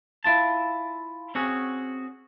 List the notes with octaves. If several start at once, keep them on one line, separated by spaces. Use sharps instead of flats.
E4 F4 A5
C4 C#4 F#4 G#4